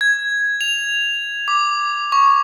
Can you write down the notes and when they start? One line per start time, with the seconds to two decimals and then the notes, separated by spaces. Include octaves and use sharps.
0.01 G#6
0.61 F7
1.48 D6
2.12 C#6